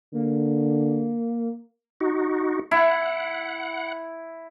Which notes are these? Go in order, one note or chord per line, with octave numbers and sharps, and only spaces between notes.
D3 A#3
D#4 F#4
E4 F#5